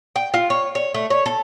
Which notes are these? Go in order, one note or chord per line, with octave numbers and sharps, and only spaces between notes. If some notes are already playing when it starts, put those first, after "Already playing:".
G5
F4
C#5
C#5
A3
C#5
A4